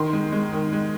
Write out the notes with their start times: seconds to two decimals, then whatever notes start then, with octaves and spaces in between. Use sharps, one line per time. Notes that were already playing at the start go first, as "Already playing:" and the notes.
Already playing: D#3 C6
0.13 G#3
0.32 G#3
0.52 D#3
0.72 G#3